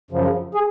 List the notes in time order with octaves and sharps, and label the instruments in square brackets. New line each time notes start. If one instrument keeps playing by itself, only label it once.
[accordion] F#2 C#3 F3
G#4